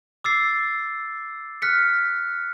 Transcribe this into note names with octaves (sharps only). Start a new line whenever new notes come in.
D6 E6 A6 C7
F6 F#6 B6 C#7